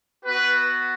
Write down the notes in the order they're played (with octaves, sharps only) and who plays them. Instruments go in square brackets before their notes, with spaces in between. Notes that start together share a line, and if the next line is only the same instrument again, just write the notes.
[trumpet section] B3 F#4 B4